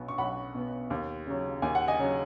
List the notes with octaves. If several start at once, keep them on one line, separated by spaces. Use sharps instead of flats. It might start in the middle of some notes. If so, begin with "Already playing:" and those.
Already playing: B1 B2 B3
C#6
B1 F#5 B5
B2 B3
D#2
C#3 F#3
D#2 G#5
F#5
D#5 G#5
C#3 F#3